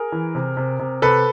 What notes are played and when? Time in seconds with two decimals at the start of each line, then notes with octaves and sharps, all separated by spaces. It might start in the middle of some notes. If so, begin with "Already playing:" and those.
Already playing: G#4 A#4
0.12 E3
0.35 C3
0.57 C3
0.79 C3
1.02 C3 A4 B4